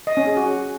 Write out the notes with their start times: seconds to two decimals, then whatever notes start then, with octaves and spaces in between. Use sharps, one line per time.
0.07 D#5
0.17 C#4
0.27 G#4
0.37 F#4